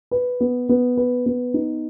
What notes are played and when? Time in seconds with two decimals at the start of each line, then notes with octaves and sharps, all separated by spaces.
0.11 B4
0.40 B3
0.69 B3
0.97 B4
1.26 B3
1.54 D#4